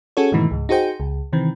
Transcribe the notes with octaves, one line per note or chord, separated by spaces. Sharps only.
C#4 F#4 G#4 A4 C#5
G#2 B2 D#3 E3 A3
C#2 G#2
D#4 F#4 G#4 C5 G5
C#2
C3 D#3 E3 C4